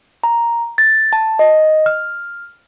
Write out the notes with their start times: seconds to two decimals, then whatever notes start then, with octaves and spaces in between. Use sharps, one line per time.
0.24 A#5
0.78 A6
1.13 A5
1.39 D#5
1.86 F6